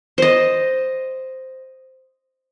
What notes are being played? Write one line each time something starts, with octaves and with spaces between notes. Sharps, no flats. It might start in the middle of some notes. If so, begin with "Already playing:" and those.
C5 D#5